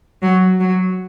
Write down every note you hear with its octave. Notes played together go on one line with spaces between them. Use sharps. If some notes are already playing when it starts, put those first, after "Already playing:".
F#3
F#3